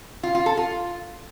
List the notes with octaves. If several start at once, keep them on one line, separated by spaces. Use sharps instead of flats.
F4
F4
A4
F4